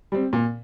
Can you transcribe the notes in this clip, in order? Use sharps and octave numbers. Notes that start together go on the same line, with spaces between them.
G3 C4
A#2